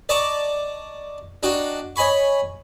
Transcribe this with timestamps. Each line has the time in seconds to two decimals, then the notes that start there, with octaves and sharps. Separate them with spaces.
0.09 D5 D#5 A5 A#5 C#6 D6
1.43 D4 D#4 F#4 G5
1.96 C#5 D#5 G#5 B5 C#6